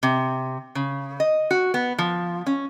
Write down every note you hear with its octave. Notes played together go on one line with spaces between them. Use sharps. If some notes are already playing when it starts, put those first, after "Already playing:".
C3
C#3
D#5
F#4
B3
F3
C#4